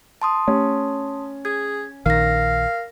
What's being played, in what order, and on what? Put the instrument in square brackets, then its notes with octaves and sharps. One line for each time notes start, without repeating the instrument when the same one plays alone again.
[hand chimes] A5 C6 D#6
[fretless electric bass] A3 [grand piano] C#4 G4
[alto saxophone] G#4 [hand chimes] G#6
[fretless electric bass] A#1 D#3 [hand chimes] A#4 A#6 [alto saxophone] F5